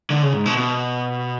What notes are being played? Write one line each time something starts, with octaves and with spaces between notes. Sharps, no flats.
D3
C#3
G#2
B2
B2